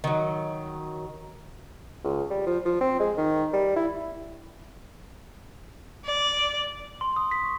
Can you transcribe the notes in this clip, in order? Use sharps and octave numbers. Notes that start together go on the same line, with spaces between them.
D#3 F#3
C#2
G3
F3
F3
C4
G#3
D#3
G3
E4
D5
C6
D#6
B6
C#6